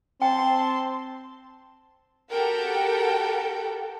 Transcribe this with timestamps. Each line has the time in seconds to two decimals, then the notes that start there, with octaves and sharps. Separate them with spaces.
0.22 C4 G5 A5 C6
2.29 F#4 G4 A4 A#4 F#5 G5